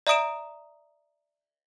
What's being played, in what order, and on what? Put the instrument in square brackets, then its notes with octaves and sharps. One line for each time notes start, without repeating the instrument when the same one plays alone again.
[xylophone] D5 E5 A#5 D#6 D7 E7